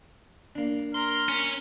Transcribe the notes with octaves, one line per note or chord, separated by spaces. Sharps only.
A#3 D4
A#4 C6
C#4